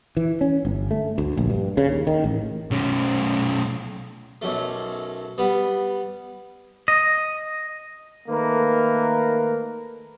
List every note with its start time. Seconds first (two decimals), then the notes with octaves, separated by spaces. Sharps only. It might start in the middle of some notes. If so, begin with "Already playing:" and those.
0.17 E3
0.41 C#4
0.65 G1
0.91 A3
1.18 D2
1.37 A#1
1.50 G2
1.77 C#3
1.89 D#2
2.07 D#3
2.24 A1
2.71 B1 C#4
4.42 B1 F#2 A3
5.38 G3 B3
6.88 D#5
8.29 D#3 A3 A#3 A#4 B4